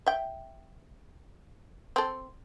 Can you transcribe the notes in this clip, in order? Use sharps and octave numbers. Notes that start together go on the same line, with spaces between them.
E5 G5
C4 A4